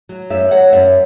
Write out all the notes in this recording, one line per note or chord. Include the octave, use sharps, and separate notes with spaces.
F#3
F#2 E5
F#3 F#5
F#2 E5